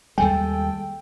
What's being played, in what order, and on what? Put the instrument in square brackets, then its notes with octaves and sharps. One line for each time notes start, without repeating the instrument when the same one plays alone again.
[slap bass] D#2 G3 G#3 [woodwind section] A4 [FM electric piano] G5 [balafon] G#5